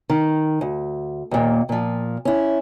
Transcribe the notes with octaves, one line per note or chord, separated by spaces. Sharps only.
D#3
D2
D#2 A#2
A#2 F3
C#4 E4